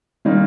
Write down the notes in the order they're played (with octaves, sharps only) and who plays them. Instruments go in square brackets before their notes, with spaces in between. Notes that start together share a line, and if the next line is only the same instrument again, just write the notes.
[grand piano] D#3 G3 A#3 D#4